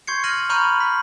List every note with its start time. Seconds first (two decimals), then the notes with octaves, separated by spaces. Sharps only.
0.07 C6 C#6 G6 G#6 C7 C#7
0.24 F6 A#6 D#7 F#7
0.49 A#5 B5 C#6 F6 G6 D#7
0.80 B6